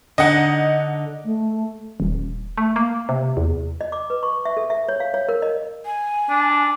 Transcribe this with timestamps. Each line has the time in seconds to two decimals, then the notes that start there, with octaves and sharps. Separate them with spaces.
0.18 D3 D#4 D#5 F#5
1.25 A3
2.00 D#1
2.58 A3
2.76 A#3
3.09 C3
3.37 E2
3.81 D#5
3.92 D6
4.10 B4
4.23 C#6
4.45 E5
4.57 A4
4.70 E5
4.89 C#5
5.00 F5
5.14 C#5
5.29 A#4
5.42 D#5
5.86 G#5
6.29 D4